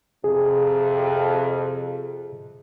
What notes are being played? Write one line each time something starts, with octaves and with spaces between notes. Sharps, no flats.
F2 C3 G#4